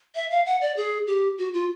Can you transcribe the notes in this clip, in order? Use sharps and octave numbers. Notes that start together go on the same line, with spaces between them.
E5
F5
F#5
D5
G#4
G4
F#4
F4